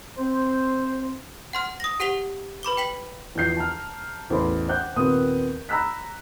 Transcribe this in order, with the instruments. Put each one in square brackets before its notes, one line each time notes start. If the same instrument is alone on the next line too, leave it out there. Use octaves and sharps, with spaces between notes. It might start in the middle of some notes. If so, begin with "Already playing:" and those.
[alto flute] C4 [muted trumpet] C5
[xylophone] F#5 C6 F6
D#6 A#6
G4 F#5 B6 F7 G7
B4 B5 D6 G7
G5 B6 F#7
[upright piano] E2 F3 G6 C7
A5 A#5 F6
A1 E2 A4 C5 B5 C6
C5 F#5 G5 D6 F#6 G6
D#2 A#2 B3 C4 D#6
A#5 B5 E6 F#6 B6